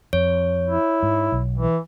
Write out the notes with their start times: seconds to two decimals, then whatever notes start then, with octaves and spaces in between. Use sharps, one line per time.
0.13 F2 C#5
0.67 E4
1.03 G#2
1.32 B1
1.58 E3